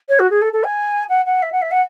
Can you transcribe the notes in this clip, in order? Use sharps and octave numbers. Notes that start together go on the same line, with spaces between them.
C#5
F#4
G#4
A4
A4
G#5
F#5
F#5
E5
F#5
E5
F#5